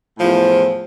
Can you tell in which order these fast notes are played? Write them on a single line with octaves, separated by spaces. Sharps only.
A2 F3 E2